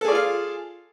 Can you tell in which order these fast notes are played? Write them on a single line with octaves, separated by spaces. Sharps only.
A4 G#4 D5 F4 F5